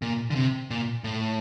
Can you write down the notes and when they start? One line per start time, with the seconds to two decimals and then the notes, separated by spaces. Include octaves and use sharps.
0.02 A#2
0.30 D3
0.35 C3
0.71 A#2
1.04 A2